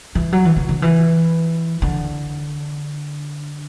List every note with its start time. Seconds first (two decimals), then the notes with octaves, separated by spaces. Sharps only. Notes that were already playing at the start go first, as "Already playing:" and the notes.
0.15 E3
0.33 F#3
0.45 E3
0.56 D3
0.69 D3
0.82 E3
1.82 D3